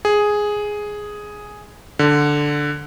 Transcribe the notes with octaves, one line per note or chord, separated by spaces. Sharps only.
G#4
D3